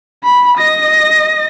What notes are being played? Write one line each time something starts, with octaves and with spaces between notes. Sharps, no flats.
B5
D#5 A#6